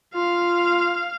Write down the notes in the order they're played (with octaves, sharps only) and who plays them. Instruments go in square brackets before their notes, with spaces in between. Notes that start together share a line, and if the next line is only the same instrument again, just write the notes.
[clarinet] F4 [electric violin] F5